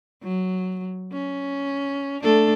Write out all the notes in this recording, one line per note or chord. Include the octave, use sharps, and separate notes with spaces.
F#3
C#4
A3 D4 A4